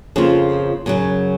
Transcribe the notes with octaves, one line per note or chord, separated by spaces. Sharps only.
F2 C#3 F3 A#3 F4
F#2 C#3 F#3